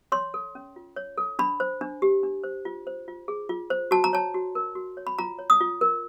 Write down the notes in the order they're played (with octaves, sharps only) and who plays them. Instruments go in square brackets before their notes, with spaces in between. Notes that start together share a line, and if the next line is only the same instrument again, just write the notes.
[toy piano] C#5 C6
A4
C#4
F4
C#5
A4
D4 B5
C5
D4
G4
D4
C5
F4
C5
F4
G#4
F4
C5
F#4 A5
A#5
C#5 A5
F#4
A#4
F#4
C#5
B5
F4 A#5
C#5
D#6
F4
A#4